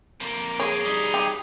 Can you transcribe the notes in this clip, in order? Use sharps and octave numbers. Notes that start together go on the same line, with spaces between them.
F2 A#3
G#4 C#5
G3 D#4
G4